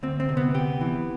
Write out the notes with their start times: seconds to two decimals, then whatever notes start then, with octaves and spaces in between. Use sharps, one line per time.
0.03 D2 C4
0.20 C4
0.29 C3
0.37 B3
0.54 B3 G4
0.81 E3